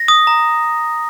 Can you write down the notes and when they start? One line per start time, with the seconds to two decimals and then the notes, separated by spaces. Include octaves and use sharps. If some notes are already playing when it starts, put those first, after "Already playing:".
Already playing: A#6
0.08 D#6
0.27 A#5